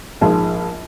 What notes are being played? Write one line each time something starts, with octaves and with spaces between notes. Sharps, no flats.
A#1 G#2 F3 G#3